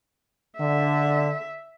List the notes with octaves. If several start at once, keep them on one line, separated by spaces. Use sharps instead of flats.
D3 E5